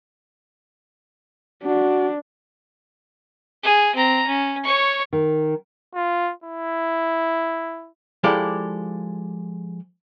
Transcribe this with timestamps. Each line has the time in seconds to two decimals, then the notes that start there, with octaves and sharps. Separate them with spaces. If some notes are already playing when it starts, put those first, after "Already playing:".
1.63 D4 F#4
3.63 G#4
3.95 C4 A#5
4.27 C#4
4.64 C#5 C#6
5.13 D#3
5.95 F4
6.44 E4
8.24 F3 G#3 E4 G4 A4 D5